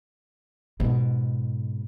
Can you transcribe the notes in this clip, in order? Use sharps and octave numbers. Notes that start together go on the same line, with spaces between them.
G#2 B2